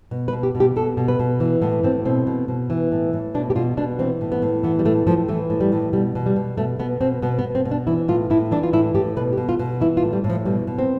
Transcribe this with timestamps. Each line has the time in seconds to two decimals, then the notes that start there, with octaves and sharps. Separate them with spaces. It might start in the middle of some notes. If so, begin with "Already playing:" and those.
0.11 B2
0.28 B4
0.33 B2
0.43 G4
0.55 B2
0.60 G4
0.76 B2 A4
0.97 B2
1.08 B4
1.19 B2
1.40 E3
1.62 A2 B3
1.83 A2 C4
2.05 B2 C4
2.27 B2
2.48 B2
2.70 E3
2.92 A2
3.13 A2
3.34 B2 D4
3.50 G4
3.56 B2 F4
3.77 B2 D4
3.99 E3 C4
4.21 A2
4.32 B3
4.42 A2
4.63 E3 B3
4.79 G3
4.85 A2 A3
5.07 A2 F3
5.28 E3 A3
5.50 A2
5.61 G3
5.72 A2
5.93 B2 G3
6.15 B2
6.26 G3
6.36 B2
6.57 B2 A3
6.79 B2 B3
7.01 B2 C4
7.22 B2 B3
7.39 B3
7.44 B2
7.55 C4
7.65 B2
7.71 D4
7.87 E3 E4
8.08 A2 F4
8.30 A2 E4
8.51 E3 D4
8.63 F4
8.73 A2 E4
8.95 A2 G4
9.16 B2 B4
9.33 G4
9.37 B2
9.49 F4
9.59 B2
9.81 E3 E4
9.97 F4
10.03 A2
10.13 G3
10.24 A2
10.30 F3
10.45 B2 G3
10.67 B2
10.78 C4